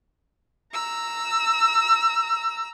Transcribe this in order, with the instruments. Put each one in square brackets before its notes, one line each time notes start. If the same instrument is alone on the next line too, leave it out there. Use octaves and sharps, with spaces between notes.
[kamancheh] A#5 E6